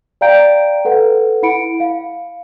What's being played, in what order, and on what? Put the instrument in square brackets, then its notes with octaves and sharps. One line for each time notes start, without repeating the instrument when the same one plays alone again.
[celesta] D5 F5 G5 A#5 G6 D7
A4 B4 F#5
E4 F#5 B5 C#7 D7
F5